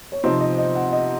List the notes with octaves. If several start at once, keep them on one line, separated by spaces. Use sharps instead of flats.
C#5
C3 F3 C4 D#4 C5
D#5
D#5
F#5
D#5